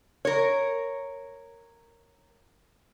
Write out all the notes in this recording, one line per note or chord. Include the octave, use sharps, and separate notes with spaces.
A#4 C#5